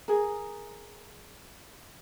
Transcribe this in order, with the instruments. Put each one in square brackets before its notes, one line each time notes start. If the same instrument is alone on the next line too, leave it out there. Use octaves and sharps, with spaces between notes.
[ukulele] G#4 A#4